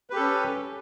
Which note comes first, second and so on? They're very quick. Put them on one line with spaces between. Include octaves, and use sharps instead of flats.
B4 G4 A4 C#4